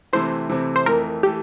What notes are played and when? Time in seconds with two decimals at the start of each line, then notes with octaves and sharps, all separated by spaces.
0.13 C3 E3 A3 C4 E4 C5
0.49 C3 E3 A3 C4 E4
0.76 C5
0.86 F2 E3 A3 A#4
1.23 E3 A3 G4